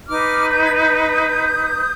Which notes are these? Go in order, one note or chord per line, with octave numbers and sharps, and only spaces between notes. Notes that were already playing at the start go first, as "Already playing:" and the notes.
D#4 B4 D6 F6
G6
G#6
D#6 G6